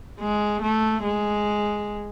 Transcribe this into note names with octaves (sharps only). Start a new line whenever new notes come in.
G#3
A3
G#3